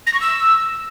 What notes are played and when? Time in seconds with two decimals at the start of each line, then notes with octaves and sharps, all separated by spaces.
0.07 A#6
0.14 C#6
0.21 E6